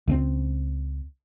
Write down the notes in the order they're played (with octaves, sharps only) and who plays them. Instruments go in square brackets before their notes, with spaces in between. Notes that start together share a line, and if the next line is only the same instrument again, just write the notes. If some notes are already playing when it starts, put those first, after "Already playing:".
[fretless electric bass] C#2 A3 C4